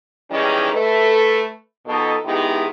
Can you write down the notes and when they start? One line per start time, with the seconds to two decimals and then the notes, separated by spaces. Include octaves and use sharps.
0.30 D#3 E3 G3 G#3 C#4 D#4
0.73 A3 A4 B4
1.86 F2 B2 D#4 A4
2.24 D#3 G#3 B3 D#4 E4 G4